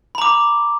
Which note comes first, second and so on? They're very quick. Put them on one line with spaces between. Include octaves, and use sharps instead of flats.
B5 A#5 D6